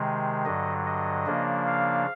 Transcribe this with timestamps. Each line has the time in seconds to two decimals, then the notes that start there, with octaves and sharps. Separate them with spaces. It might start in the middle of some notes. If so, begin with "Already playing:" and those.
Already playing: C3 D#3 G#3
0.45 G2 D3 F#3 D#5
0.86 D#5
1.26 C#3 F3 A#3 D4
1.67 F5